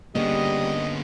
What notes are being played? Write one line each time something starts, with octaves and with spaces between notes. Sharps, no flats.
D3 G3 A#3 B3 C#4 G#4 D#5